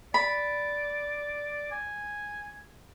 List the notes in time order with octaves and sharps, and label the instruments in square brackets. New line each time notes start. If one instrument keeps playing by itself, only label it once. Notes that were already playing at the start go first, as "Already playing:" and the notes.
[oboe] D5 [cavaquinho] B5
[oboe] G#5